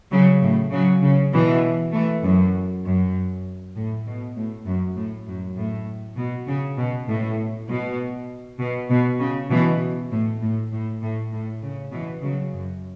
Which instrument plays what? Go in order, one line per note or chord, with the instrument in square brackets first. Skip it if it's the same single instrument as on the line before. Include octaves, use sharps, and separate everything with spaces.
[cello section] C#3 F#3
A2
C#3 F#3
C#3
B2 E3
E3 A3
F#2
F#2
A2
B2
A2
F#2
A2
F#2
A2
B2
C#3
B2
A2
B2
B2
B2
C#3
B2 E3
A2
A2
A2
A2
A2
C#3
B2 E3
C#3 F#3
F#2